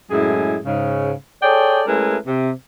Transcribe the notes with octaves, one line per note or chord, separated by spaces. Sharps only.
F#2 A2 G#3 E4 G#4
G#2 C#3
G#4 A4 C#5 D5 G5
G#3 A3 C#4 E4 A#4 B4
C3